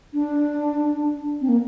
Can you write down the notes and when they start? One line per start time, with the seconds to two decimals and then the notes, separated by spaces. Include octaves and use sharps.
0.14 D4
1.41 C4
1.49 A#3